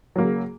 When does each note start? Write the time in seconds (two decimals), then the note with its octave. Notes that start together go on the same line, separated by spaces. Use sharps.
0.16 F#3
0.18 A#3
0.21 C#3